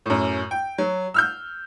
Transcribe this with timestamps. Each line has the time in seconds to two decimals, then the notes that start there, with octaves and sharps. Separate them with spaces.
0.06 F#2 A2
0.51 G5
0.78 F#3
1.14 E6 F6 G6